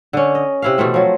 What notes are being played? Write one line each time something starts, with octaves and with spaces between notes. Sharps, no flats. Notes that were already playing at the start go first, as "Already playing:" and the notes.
D3 C#4
D#5
C3 E4 F5
B2 E3 A3 C4
F3 F#3